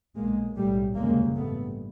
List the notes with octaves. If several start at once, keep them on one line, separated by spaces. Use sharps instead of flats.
B1 A#2 G#3 A#3
B1 A2 G3 A3
F1 D#2 C#3 G#3 A#3
A1 G2 A3 B3